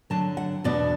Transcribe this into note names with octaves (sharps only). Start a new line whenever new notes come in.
D3 F#3 D4 A5
F#5
E2 B2 B3 D4 D5